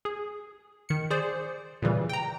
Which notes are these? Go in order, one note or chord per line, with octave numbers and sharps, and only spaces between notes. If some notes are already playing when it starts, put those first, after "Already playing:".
G#4
D#3 C#7
G#4 C5 D5
A#2 C#3 E3 G3
G5 A#5